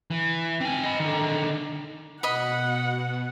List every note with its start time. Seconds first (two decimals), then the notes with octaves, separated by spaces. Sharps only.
0.11 E3
0.61 C4 G#5
0.83 D#5 B5
1.00 D3 D#3
2.23 B2 D#5 F#5 B5